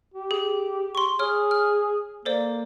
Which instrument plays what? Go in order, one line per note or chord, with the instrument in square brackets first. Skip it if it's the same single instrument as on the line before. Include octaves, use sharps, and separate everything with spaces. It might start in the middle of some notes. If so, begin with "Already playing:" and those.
[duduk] G4
[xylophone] G#4
C6 C#6
[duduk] G#4 [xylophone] C#5 F6
[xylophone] F6
[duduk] A#3 [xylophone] A4 C5 D5